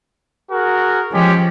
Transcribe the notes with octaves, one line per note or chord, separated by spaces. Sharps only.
F#4 G#4 A#4
F3 G#3 C#4 G4